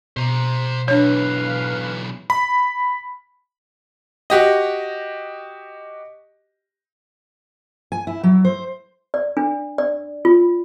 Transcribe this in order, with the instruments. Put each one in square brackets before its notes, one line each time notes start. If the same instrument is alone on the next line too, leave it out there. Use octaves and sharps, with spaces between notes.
[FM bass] B2 [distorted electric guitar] C5 A#5
[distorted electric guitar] B1 E3 [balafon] D4 C#5 [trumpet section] B4 F5
[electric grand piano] B5
[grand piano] F#4 G4 D#5
[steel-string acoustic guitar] G#5
E4
F#3
C5
[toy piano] D5
D4
D5
F4